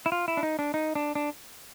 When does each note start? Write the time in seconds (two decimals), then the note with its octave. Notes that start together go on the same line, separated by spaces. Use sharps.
0.06 E4
0.12 F4
0.28 E4
0.37 D4
0.43 D#4
0.59 D4
0.74 D#4
0.95 D4
1.15 D4